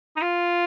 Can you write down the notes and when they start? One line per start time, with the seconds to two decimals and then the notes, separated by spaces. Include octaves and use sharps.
0.16 D#4
0.22 F4